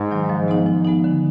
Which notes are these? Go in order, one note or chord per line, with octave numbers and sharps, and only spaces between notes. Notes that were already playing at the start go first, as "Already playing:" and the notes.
Already playing: G#2
D#3 F#3
F3
G#3 B3 D#4
F3
G#3 B3 D#4
D3